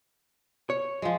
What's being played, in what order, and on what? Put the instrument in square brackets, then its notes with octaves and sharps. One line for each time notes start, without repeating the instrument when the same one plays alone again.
[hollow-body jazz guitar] C#5
[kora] F3 G#3